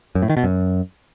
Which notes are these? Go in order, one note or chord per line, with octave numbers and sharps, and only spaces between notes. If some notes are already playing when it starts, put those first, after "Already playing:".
F#2
A2
D#3
B2
F#2